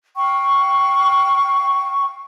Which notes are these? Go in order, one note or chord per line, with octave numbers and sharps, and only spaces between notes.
F5 G5 C#6